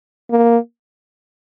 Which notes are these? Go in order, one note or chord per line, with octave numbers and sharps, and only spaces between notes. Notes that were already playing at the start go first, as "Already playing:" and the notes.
A#3